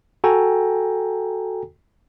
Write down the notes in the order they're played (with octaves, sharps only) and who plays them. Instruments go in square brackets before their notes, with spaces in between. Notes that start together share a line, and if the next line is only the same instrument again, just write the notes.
[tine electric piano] F#4 A4 G5 G#5 A#5